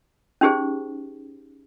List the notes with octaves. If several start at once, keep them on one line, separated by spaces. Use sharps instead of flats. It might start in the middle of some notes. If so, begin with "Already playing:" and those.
C#4 D#4 G4 G#4 C5